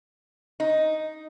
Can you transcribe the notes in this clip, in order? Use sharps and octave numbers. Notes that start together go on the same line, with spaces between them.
D#4